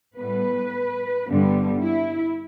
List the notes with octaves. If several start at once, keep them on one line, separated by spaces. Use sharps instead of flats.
A2 G3 B3 B4
G2 D3 G3 B3
E4